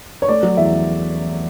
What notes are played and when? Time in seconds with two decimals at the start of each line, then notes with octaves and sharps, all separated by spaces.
0.22 C#5
0.28 A3 D5
0.43 F#3
0.57 E2 E5